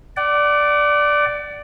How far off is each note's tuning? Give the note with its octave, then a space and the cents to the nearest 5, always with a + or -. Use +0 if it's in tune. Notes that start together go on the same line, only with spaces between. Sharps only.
D5 +0 F#5 +40